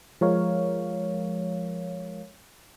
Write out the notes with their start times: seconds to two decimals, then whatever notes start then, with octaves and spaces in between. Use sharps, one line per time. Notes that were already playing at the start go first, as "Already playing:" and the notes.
0.21 F3 G#3 A#4 C#5 F5